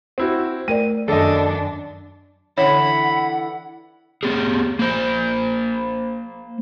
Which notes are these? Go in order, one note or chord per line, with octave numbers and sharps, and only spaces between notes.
C4 E4 F#4
A3 A#4 D5 D#7
F#2 D#3 D4 A4 D#5
D3 E3 E4 C#5 F#5 B5
B3 G4 G#4
A#3 C5